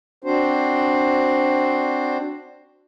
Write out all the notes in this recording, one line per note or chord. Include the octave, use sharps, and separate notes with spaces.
C4 D4 F#4 C5